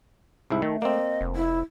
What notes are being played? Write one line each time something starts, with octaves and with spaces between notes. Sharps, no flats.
C2 G#2 E4
D#3 A3
A#3 C4 D#5
F1
E4